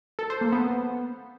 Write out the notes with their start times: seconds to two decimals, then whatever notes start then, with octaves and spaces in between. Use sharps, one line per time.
0.19 A4
0.30 C5
0.41 A#3
0.52 B3